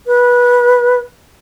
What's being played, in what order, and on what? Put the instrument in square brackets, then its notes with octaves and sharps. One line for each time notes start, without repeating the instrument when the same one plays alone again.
[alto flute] B4